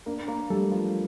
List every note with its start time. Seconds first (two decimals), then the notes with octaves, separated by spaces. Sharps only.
0.06 A#3 D4 A#4
0.28 A#3 A#4
0.50 G3 A3 A4
0.72 F3 F4